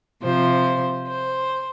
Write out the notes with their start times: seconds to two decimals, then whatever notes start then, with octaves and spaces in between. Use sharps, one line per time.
0.22 C3 F3 C5
1.06 C5